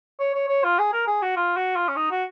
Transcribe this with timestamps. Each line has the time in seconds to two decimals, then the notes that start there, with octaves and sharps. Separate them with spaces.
0.20 C#5
0.34 C#5
0.48 C#5
0.64 F4
0.79 G#4
0.93 A#4
1.07 G#4
1.22 F#4
1.37 F4
1.57 F#4
1.76 F4
1.88 C#4
1.96 D#4
2.11 F#4